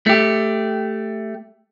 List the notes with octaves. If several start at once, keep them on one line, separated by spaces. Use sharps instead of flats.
A3 G4